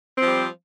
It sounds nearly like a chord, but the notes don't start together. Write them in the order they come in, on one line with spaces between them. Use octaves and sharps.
C4 F3 G3